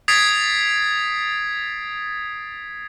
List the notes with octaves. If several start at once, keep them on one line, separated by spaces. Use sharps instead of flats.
D#6 G#6 A6 B6 C7 D7